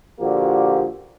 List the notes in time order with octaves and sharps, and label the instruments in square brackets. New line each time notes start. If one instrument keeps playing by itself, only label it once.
[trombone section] A#2 D3 F3 A#3 F#4 G4